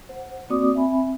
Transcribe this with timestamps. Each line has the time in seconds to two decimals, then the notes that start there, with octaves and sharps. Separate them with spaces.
0.09 C5 F#5
0.50 A#3 C4 F#4 D5 D6 D#6
0.74 C4 E5 G#5 B5